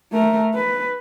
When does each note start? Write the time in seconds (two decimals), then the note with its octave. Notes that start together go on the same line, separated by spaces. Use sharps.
0.12 A3 A#4
0.55 B4